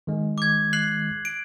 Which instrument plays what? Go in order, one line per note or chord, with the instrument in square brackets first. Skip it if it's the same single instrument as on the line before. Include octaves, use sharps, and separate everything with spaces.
[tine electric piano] D#3 G#3
[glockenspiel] D6 G#6
F#6 C7 F#7
D7